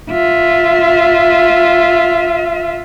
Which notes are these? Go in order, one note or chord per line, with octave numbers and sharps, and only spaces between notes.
F4 E5